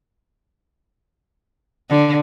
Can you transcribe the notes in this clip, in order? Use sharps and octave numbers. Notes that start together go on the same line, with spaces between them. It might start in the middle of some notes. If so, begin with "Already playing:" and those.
D3